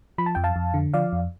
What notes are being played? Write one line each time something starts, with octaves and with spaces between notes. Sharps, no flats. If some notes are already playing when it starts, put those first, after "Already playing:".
F3 B5
A5
F2 G5
F5 A5
F2
D3
F3 D5 F5
F2